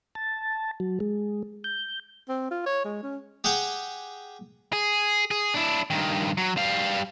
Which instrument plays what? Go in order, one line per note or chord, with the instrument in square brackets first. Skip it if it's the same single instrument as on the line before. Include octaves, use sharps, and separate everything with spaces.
[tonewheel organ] A5
F#3
G#3
G6
[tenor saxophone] C4
F4
C#5
G#3
C#4
[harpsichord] G4 G#4 F#5 G5
[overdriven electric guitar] G#4
G#4
D4 E4
G2 D#3
F#3
G3 F5